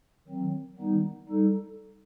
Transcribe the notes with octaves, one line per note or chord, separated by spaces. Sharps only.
D#3 F#3 C4
D#3 G3 B3 D#4
G3 D#4 A4